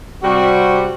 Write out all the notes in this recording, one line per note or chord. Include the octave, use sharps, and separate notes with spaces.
C3 G3 F#4